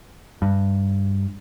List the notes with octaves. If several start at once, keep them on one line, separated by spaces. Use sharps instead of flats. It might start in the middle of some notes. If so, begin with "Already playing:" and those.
G2